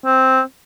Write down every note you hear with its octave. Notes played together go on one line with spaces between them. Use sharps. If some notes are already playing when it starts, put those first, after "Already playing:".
C4